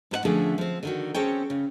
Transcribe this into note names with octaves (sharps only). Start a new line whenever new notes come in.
G#2 A4 F#5
D3 F3 A3 C#4 D4 G#4
F3 C4
D3 D#3 F#4
C4 C#4 G#4 A4 C#5 G5
C#3